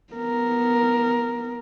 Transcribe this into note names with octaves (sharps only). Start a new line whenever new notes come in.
B3 A#4